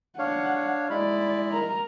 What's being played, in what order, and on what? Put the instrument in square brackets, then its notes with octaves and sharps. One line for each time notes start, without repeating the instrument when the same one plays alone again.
[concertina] D4 C#5 F5 [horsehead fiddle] F#5
[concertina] G#3 E4 B5 [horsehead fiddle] D5
[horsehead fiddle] A#4 A#5